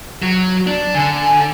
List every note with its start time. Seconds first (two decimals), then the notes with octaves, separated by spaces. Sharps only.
0.22 F#3
0.67 D4
0.95 D3 G#5